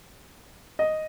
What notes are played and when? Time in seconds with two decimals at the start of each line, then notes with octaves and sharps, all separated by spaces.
0.79 D#5